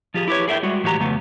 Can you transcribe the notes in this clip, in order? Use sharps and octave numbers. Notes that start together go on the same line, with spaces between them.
F3 F4 G4 G#4
E4 G4 B4 C#5
G#4 A#4 E5 F5 G5
G3 G#3 F#4
A2 E3 F#4 G4 A#5
F2 C#3 A3 B3